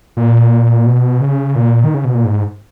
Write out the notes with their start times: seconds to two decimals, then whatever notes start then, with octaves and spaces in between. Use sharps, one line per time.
0.17 A#2
0.86 B2
1.21 C#3
1.56 A#2
1.84 D#3
1.94 C#3
2.04 B2
2.15 A#2
2.25 G#2